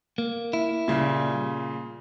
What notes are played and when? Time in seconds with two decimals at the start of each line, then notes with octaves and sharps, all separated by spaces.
0.18 A#3
0.53 E4
0.88 A#2 C#3 G3